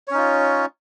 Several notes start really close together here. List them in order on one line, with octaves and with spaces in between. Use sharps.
C#5 C#4 D#4 F4